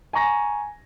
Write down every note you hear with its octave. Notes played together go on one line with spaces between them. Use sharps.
G#5 A#5 C#6 A#6